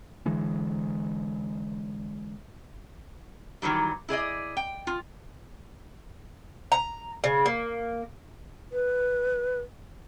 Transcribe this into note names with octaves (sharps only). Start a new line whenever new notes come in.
D3 E3 G#3
D#3 E3 F#3 G3
E4 G#4 D5 D#5
G5
F4
A#5
C#3
A#3
B4